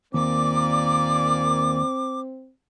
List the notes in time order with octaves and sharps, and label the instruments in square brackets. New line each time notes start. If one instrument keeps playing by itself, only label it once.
[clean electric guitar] D#2 [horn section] A#2 A#3 D5 [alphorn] C4 [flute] D6